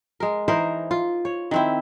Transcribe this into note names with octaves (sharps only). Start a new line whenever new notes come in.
G#3 A#4
E3 D#4 A#4 C5
F4
C#5
D#3 C4 E4